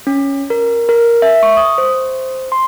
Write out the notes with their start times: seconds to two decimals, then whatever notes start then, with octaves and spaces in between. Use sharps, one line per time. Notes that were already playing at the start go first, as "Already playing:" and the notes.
0.07 C#4
0.50 A#4
0.89 A#4
1.22 E5
1.43 C#6
1.57 D#6
1.78 C5
2.52 C6